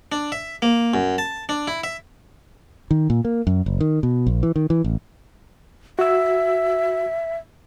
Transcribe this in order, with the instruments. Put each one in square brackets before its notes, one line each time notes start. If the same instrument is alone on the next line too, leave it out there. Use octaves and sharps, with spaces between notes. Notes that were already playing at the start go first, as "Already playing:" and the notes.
[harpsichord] D4
E5
A#3
F#2
A5
D4
E4
E5
[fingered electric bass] D#3
A#2
A#3
F#2
F#1
D#3
B2
A#1
E3
D#3
E3
A1
[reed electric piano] F#4 E6 [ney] E5